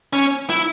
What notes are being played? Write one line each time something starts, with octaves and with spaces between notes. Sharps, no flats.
C#4
E4